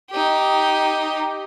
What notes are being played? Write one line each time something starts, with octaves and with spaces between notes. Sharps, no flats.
D#4 G4